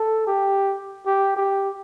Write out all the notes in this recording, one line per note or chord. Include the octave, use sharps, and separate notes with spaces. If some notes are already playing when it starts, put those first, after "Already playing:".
Already playing: A4
G4
G4
G4